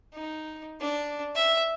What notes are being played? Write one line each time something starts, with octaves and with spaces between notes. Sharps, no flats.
D#4
D4
E5